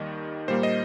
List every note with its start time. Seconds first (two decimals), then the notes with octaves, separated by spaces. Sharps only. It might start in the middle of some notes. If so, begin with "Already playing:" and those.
Already playing: D#2 D#3 G3 D#5
0.48 A#2 G3 A#3 C5
0.63 D#5